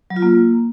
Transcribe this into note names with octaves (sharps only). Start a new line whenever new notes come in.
F#3
F4
A#3